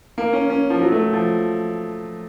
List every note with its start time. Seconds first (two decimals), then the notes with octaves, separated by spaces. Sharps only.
0.18 A#3
0.33 C#4
0.50 C#4
0.70 F3
0.81 F#3
0.92 A3
1.13 F3